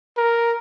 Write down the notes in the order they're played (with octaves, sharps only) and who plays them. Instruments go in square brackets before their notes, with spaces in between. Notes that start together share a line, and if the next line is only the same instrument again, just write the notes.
[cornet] A#4